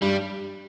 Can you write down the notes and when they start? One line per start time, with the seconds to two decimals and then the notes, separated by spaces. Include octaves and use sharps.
0.02 G2 G3